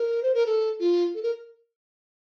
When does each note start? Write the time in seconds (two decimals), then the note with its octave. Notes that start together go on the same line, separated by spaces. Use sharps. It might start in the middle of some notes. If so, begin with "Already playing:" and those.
Already playing: A#4
0.23 C5
0.34 A#4
0.46 A4
0.80 F4
1.15 A4
1.23 A#4